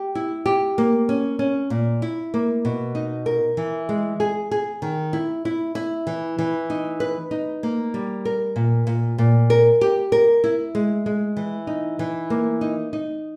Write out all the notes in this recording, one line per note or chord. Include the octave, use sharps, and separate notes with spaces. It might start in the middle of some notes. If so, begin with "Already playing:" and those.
Already playing: G4
E4
G4
A#3
C#4
C#4
A#2
E4
A#3
B2
D#4
A#4
E3
G#3
G#4
G#4
D#3
E4
E4
E4
E3
E3
D#4
B4
D#4
A#3
G3
A#4
A#2
A#2
A#2
A#4
G4
A#4
E4
G#3
G#3
E3
D#4
E3
A#3
D#4
D#4